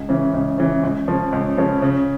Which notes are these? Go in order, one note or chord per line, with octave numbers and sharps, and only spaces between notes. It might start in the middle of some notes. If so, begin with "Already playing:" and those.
Already playing: C#2
C#3 E3
C#2
C#3 E3
C#2
C#3 F3 C#4
C#2
C#3 F3 C#4
C#3